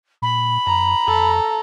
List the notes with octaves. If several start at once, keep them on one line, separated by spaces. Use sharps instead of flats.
A#2 B5
F#2 A#5
F2 A4